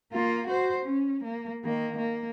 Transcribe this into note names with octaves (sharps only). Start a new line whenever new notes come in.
A#3 F4
F#4 C5
C#4
A#3
D#3 A#3
A#3